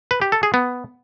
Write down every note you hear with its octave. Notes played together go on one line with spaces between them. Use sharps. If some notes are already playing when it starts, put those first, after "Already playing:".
B4
G4
A4
G#4
B3